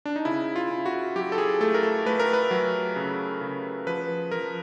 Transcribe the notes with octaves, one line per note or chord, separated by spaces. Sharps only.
D4
D#4
C#3 E4
F4
C#3
F#4
F#3 G4
A4
G#4
A3 A4
A#4
A4
A3 B4
A#4
B4
F#3
C#3
C#3
F3 B4
F3 A#4